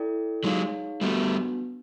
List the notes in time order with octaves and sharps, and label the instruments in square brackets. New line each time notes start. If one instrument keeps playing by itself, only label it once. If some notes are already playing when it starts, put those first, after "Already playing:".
Already playing: [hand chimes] E4 A4 D5 G5
[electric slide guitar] F#3 G#3 [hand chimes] D#4 G#4 C#5 F5
[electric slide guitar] G3 A3 [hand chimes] B3 D4 F#4